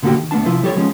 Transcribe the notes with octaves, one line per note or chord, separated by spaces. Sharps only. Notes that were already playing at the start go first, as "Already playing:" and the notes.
A#2 D3 A3 A#3 F#4 G4
D#3
D2 A3 B3 D4 A5
C3 F3 E4
G3 G4 A4 C#5
F3 G#3 C#4